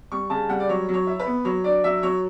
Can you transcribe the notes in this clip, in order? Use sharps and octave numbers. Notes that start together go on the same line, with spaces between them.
G3 C#6
C#3 A5
G3 F#5
D5
F#3 C#5
F#3
C#5
E4
B4
B3
F#3 C#5
D4 D5
F#3 E5
F#3 C#5